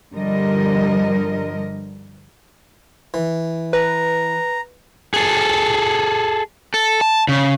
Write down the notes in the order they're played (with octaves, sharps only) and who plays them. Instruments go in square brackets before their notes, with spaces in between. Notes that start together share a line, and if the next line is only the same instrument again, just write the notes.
[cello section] G2 D3 F3 G3 A#4 D#5
[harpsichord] E3
[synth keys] B4 [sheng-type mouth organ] A#5
[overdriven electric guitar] G#4 A4
A4
A5
C#3